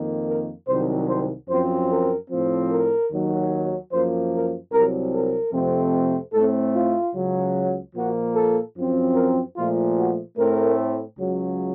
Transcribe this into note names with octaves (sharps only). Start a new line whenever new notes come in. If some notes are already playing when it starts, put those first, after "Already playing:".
Already playing: F2 D#3 A#3
A#4
C2 C3 D#3 F#3 C5
C5
F#2 F3 C4 C5
A#4
A2 F3 C4
A#4
D#2 D#3 F#3
F#2 F3 A#3 C5
A#4
C2 C3 F#3 A#4
A#4
F2 C3 F3 A3 C4
A2 A3 C4 A4
F4
C#2 C#3 F#3
A#2 F3 A#3 F#4
A4
F#2 F3 C4
A#4
A#2 F3 A3 F4
F#4
A2 A3 C4 A#4
C#2 C#3 F#3